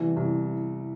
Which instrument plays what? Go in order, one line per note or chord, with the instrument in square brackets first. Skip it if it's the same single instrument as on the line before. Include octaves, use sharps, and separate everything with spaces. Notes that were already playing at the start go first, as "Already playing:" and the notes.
Already playing: [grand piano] C2 B3 [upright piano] E3
[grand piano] C2